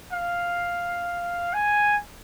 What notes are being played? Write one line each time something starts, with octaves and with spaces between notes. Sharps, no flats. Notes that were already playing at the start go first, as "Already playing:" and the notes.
F5
G#5